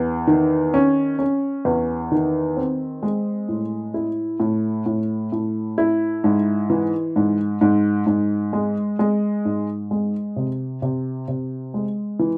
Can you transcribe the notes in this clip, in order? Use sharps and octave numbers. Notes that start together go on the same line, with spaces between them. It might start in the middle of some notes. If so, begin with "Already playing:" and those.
Already playing: E2
D#3
C#4
C#4
E2
D#3
C4
G#3
A2
E4
A2
A2
A2
E4
G#2
E3
G#2
G#2
G#2
G#3
G#3
G#2
G#3
C3
C3
C3
G#3
E3